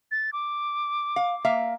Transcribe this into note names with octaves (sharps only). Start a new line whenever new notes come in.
A6
D6
F5
A#3 E5 F5